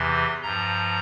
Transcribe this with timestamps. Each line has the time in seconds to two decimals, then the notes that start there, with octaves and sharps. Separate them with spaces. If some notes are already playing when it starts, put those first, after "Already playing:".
Already playing: E2 C3 E3 C6
0.42 G2 F3 A#5